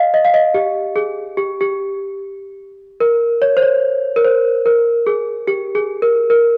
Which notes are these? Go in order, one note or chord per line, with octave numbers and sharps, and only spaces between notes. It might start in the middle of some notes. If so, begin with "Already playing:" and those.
Already playing: D#5 F5
D#5
F5
D#5
G4
G#4
G4
G4
A#4
C#5
C5
C#5
A#4
C5
A#4
G#4
G4
G#4
A#4
A#4